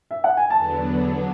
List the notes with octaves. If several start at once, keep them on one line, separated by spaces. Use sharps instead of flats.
E5
F#5
G#5
E2 D3 F#3 B3 D4 A5